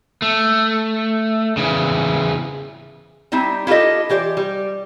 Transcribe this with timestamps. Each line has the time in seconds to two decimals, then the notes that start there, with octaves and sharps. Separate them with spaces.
0.22 A3
1.57 C#3 E3
3.32 G3 C4 D#4 E4
3.67 E4 F4 G4 A4 D#5
4.09 E3 G4 C5 D5
4.37 G3